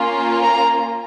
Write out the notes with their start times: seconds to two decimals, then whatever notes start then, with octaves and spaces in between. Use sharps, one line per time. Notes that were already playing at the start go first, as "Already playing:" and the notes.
Already playing: A#3 C#4 F4
0.42 A#5